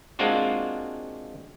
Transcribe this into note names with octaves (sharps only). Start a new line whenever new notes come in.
G#3 A#3 C4 D4 F4 F#4